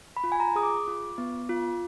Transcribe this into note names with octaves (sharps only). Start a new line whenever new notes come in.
B5
F4
G#5
A#5
G#4 D#6
D6
F4
B3
F4